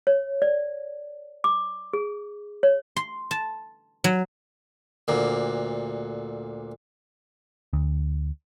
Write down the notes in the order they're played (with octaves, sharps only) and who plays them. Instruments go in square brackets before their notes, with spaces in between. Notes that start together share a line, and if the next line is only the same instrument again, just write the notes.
[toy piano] C#5
D5
D6
G#4
C#5
[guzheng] C6
A5
F#3
[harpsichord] D2 A#2
[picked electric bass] D2